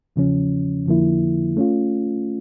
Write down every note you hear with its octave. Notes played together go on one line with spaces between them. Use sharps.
E2 C#3 F3 C#4
F2 D3 F3 A#3 E4
A3 C#4 F4